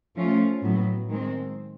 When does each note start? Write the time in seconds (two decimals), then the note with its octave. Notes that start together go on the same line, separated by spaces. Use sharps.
0.15 F3 A3 C#4 F4
0.62 A2 F#3 B3
1.09 D#3 G#3 C4